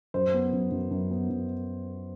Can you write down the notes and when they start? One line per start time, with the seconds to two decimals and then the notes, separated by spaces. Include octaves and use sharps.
0.14 F#2 C5
0.34 B3
0.53 F#2
0.71 F#2
0.91 F#2
1.11 B3
1.30 F#2